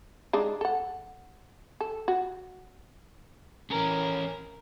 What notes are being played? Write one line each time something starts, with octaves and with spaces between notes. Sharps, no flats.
G#3 D4 D#4
A4 F#5
A4
F#4
E3 C#4 A#4